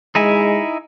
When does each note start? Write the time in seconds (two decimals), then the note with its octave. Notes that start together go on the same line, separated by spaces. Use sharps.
0.15 G#3 D#4 E4 G#5